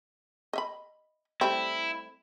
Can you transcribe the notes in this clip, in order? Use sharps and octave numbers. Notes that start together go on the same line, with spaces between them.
D#5 E5 B5
G3 A3 C4 E4